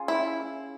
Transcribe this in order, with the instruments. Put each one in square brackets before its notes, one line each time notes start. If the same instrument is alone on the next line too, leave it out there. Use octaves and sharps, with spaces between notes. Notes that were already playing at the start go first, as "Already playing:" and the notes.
Already playing: [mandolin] C#4 F4 G#4
[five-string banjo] E4